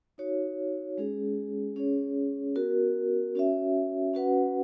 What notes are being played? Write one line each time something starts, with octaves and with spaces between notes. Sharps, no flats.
D#4 F#4 C#5
G#3 C#4 G#4
C#4 G#4 C#5
B3 F#4 A#4
C#4 F#4 C#5 E5
C#4 F#4 B4 F#5